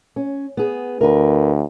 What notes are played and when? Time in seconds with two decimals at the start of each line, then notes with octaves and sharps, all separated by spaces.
0.16 C#4
0.57 B3 G#4
1.01 D2 A#4 B4